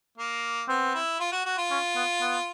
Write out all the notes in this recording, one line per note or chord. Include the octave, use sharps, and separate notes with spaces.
A#3
B3 C4
E4
F4
F#4
F#4
F4
C#4
B3
B3